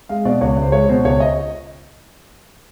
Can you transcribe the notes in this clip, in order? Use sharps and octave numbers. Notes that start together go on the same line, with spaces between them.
G#3 F5
B2 D5
C#2 C#5
C#2
C5
G#3 C#5
B2 C5
C#2 C#5
D#5